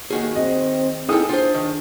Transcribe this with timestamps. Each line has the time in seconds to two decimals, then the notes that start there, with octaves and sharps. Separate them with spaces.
0.11 D#3 A#3 F#4 G#4
0.36 C4 D#5
1.09 D#4 E4 G#4 A4 G5 D#6
1.29 D4 F4 C5
1.54 D#3